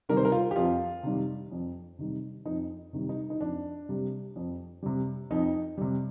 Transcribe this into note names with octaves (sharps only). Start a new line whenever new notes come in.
C3 D#3 G3 A#4
C5
A#4
F4
G4
F2 F4
C3 D#3 G3
F2
C3 D#3 G3
F2 D#4
C3 D#3 G3
D#4
D#4
F2 D4
C3 G3
F2
C3 G3
F2 D#4
C3 G3